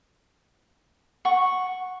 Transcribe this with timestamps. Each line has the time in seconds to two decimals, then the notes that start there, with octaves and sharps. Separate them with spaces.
1.25 F#5 C#6